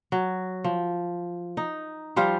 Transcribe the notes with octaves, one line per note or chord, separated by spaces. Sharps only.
F#3
F3
D#4
F3 G3 C5 F5